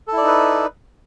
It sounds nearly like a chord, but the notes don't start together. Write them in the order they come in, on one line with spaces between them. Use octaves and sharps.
A4 E4 D5 D#4 B4